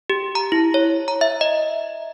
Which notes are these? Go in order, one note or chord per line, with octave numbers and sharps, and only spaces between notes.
G4
A#5
E4
C#5
A#5
E5
D#5